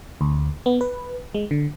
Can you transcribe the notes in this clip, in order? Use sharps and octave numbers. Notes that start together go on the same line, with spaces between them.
D2
B3
B4
G#3
D3